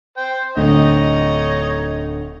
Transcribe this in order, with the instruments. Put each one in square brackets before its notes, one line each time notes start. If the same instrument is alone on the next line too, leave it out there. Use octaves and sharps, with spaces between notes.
[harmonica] C5 G5
[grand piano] D1 D3 A3 [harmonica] D#4 C#5 D#5